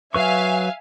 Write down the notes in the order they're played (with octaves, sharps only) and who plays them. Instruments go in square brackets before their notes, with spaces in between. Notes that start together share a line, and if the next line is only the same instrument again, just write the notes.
[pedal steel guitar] F#3 B4 C#6 [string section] E5 F5 G#5